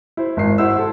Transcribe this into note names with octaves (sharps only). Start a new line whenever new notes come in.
E4 C5
G#1 C7
E4 C5 F#5 E6
A4